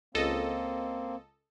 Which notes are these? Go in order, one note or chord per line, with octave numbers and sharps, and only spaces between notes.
C#2 A#3 C4 A4 D#5